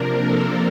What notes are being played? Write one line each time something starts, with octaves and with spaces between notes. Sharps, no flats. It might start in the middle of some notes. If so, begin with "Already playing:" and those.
Already playing: C3 F3 A#3 D4 A#4
A4